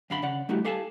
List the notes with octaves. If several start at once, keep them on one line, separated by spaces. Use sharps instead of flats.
F#2 D3 F5 F#5 B5 C6
C#3 D5 F#5
G3 A3 D#4 E4 F#4 G4
G4 A4 F5 F#5 G#5 A5